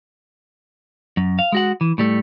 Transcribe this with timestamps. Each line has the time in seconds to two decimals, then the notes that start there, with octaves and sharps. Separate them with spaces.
1.17 F#2
1.39 F5
1.52 G#3 F#4 F#5
1.81 E3
1.98 A2 G3 A3